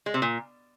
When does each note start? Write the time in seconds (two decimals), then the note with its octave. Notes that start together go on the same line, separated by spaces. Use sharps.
0.06 G#3
0.14 C3
0.22 A#2